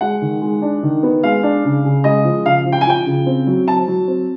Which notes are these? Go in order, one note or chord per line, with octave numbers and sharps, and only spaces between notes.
G#3 F#5
D#3
G#3
D4
D#3
B3
G#3 F5
D4
C#3
C#3
G#3 D#5
F3
C#3 F5
F3
G5
G#5
F3 G5
C#3
C4
F#3
F#3 A5
F#3
C4